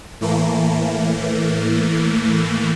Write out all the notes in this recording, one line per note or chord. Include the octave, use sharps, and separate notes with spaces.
A2 E3 A3 A#3